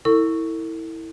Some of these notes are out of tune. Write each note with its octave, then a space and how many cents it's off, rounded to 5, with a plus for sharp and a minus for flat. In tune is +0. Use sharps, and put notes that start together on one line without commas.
E4 -15 A4 +45 C#6 +0